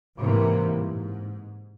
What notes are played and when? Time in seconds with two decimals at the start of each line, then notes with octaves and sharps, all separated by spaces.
0.20 G#2 C3 E3 A#3
0.75 G#2